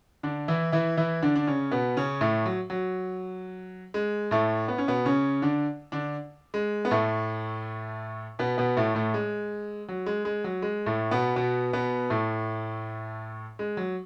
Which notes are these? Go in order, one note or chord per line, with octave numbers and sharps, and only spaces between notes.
D3 D4
E3 E4
E3 E4
E3 E4
D3 D4
D4
C#3 C#4
B2 B3
C#3 C#4
A2 A3
F#3
F#3
G#3
A2 A3
B3
C#4
B2 B3
C#3 C#4
D3 D4
D3 D4
G#3
B3
A2 A3
B2 B3
B2 B3
A2 A3
A2 A3
G#3
F#3
G#3
G#3
F#3
G#3
A2 A3
B2 B3
B2 B3
B2 B3
A2 A3
G#3
F#3